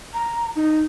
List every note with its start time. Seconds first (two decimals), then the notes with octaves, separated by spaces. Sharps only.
0.14 A#5
0.55 D#4